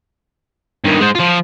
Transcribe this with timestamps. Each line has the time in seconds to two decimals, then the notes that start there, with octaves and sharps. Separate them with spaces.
0.85 G2 D#3
1.00 G#3 C5
1.15 F3 F4